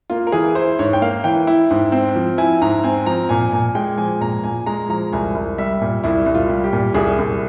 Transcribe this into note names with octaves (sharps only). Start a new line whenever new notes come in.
A#3 F4
A#4
E3 G#4
E4 C5
G#2 C#5
G5
A#3 F5
E3 G5
E4
G#2
C4
F3
E4 G#5
G#2 A#5
C4 G#5
F3 A#5
A#2 G#5
A#2 G#5
G#3 G5
F3 G#5
A#2 A#5
A#2 G#5
G#3 A#5
F3 A#5
C2 G#5
C2
G3 E5
A#2
C2 E4
C2
F4
G3
G4
A#2
C2 G#4
C2